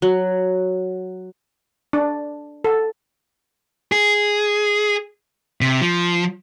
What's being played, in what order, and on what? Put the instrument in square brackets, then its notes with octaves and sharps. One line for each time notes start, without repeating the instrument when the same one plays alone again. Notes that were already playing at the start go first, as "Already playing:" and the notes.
[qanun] F#3
[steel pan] D4
A4
[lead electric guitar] G#4
C3
F3